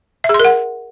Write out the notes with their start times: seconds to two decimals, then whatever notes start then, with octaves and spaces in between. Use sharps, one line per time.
0.24 E5
0.29 G#4
0.34 C6
0.40 A#4
0.45 F#5